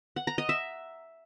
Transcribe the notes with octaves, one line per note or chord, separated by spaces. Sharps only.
F#5
A#5
D#5
E5